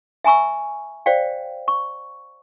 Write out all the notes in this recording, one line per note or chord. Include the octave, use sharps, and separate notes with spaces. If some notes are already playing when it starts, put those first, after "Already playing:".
E5 G#5 A#5 C#6 E6
C5 D5 F5 G5
C#6